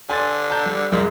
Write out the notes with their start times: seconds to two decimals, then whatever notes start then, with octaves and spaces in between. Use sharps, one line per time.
0.10 D3 G#5 C6 A6
0.50 A5 A#5 G6
0.66 G3
0.92 C2 F#2 A#2 G#3